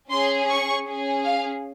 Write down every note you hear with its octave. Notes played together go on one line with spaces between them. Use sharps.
C#4 G#4 C6
C#6
C#4 G#4
F5